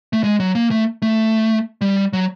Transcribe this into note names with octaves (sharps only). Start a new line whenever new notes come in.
A3
G#3
F#3
A#3
A3
A3
G3
F#3